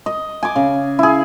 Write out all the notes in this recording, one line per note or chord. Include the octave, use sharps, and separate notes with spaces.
D#5
G#5 D6
C#3
E4 G#4